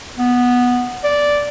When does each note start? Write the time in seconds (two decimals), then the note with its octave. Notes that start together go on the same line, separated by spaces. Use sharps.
0.18 B3
1.04 D5